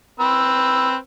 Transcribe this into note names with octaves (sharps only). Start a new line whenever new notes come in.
C4 B4 E6